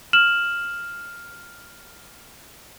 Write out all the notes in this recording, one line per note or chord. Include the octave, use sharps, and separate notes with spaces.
F6 E7 F#7